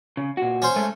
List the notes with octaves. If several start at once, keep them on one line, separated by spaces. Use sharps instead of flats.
C#3
A#2 F#4
C#4 C5
G#3 A3 A4